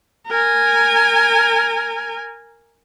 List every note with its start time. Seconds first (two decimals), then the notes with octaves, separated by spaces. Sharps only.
0.27 A#4 G#5